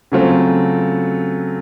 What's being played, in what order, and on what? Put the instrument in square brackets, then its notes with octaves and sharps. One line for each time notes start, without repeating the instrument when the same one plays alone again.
[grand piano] C#3 F#3 A3 C4 F4